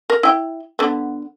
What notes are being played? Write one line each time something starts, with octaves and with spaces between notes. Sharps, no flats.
A#4
E4 G5
D3 B3